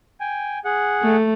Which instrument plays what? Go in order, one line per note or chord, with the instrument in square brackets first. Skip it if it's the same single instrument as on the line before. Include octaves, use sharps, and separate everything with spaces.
[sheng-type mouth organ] G5 G#5
G#4 F#5
[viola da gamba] A3